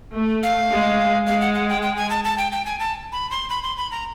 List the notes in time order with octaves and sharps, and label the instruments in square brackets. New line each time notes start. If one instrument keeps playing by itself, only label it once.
[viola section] A3
[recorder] F5
[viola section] G#3
[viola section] G#3 [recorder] F5
[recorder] F#5
F#5
G5
G5
G#5
A5
A5
G5
G5
G#5
A5
B5
C6
B5
C6
B5
A#5